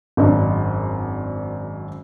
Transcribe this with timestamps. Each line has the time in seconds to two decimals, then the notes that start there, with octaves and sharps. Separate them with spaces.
0.17 G#1 F#2 D4 D#5